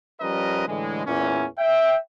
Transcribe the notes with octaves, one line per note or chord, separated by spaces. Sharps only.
F3 G3 C#4 A#4 B4 D#5
A2 D3 E3 G#3
E2 A#2 E3 C#4
E5 G5